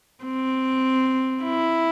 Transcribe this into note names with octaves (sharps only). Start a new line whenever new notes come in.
C4
E4